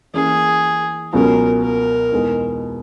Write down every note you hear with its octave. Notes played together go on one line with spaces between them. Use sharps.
E3 A#3 C#4 G#4
C#2 B2 F#3 C#4 G#4 A#4
A#4
E2 B2 G#3 D#4 G#4